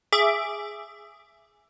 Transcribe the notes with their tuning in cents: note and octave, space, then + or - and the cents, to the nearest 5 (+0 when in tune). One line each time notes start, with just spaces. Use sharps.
G#4 +0 E5 +15 D6 +0